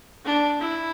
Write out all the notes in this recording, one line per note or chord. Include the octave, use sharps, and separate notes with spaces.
D4
E4